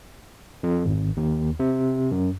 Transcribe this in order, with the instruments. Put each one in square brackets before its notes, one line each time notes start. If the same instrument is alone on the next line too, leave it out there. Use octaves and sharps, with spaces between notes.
[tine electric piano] F2
G#1
D#2
C3
F#2